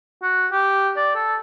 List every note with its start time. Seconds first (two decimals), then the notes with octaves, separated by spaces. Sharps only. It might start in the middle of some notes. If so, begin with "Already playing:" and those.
0.23 F#4
0.52 G4
0.96 D5
1.15 A4